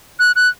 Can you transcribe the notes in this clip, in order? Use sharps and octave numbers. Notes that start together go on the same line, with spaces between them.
F#6
F#6